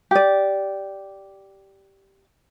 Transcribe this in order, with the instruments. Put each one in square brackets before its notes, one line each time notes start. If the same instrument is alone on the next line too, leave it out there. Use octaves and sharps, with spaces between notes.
[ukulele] G4 D5